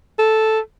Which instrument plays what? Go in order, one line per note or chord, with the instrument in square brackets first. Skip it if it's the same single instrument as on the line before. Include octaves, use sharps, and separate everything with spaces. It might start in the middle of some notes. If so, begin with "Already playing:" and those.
[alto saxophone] A4